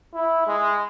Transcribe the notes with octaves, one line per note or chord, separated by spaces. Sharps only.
E4
G#3